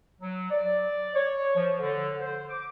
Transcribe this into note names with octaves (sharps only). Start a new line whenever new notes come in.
F#3
D5
C#5
F3
D3
C5
D6